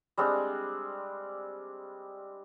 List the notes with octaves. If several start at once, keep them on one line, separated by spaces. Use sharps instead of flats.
G3 G#3 C4 D4